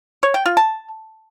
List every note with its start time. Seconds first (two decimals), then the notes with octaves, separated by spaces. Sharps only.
0.23 C#5
0.34 G5
0.46 F4
0.57 A5